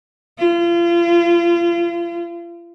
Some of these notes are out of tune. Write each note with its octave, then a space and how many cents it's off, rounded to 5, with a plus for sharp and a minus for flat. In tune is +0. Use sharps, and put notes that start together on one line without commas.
F4 -35